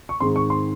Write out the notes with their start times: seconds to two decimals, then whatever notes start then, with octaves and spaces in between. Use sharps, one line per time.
0.09 C#6
0.20 G#2 D#3 G#3 C4 C6
0.36 C#6
0.50 C6